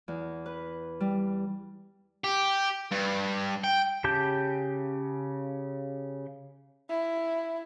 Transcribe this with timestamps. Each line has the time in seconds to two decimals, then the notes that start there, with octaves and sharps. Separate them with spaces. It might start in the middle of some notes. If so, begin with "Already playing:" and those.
0.08 E2
0.46 B4
1.00 G3
2.24 G4
2.91 G2
3.64 G5
4.04 C#3 G4 A5 G6
6.90 E4